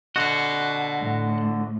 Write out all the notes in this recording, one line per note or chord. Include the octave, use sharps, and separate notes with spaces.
D3 F#4 D#5 F#5
A2